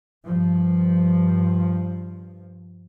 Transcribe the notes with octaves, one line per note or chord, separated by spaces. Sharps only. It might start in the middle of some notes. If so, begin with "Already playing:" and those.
G2 F3